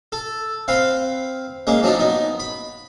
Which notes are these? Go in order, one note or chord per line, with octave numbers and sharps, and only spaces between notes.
A4
C4 B4 F5
G#3 A#3 C#4
F3 F#3 D4 D#4
B3 D#4
B5